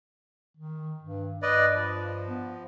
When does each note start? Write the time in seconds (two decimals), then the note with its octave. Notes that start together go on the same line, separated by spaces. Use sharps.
0.57 D#3
1.02 G2
1.42 G2 B4 D5 D#5
1.74 F3
2.28 B3